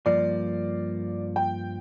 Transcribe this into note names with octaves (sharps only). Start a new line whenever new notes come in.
G2 F3 A#3 D5
G5